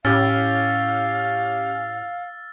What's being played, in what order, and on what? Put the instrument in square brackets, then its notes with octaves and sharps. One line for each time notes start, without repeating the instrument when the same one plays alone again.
[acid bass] A2 [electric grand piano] C#4 G4 [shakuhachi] F5 [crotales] E6 F6 A6